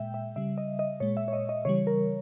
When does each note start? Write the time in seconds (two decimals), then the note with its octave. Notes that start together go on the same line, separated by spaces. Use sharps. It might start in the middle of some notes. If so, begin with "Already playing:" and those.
Already playing: A#2 G#3 E5 G5
0.14 E5
0.36 C#3 G3 E5
0.58 D#5
0.79 D#5
1.00 A#2 G#3 C#5
1.17 E5
1.28 C#5
1.33 D#5
1.49 D#5
1.65 C#3 E3 G3 C#5
1.87 A#4